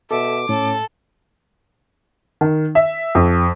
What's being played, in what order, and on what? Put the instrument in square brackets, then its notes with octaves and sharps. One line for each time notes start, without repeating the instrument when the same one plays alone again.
[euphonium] B2 [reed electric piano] A4 [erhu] E5 [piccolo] D6
[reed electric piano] A2 [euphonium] C#4 [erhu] A4
[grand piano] D#3
E5
F2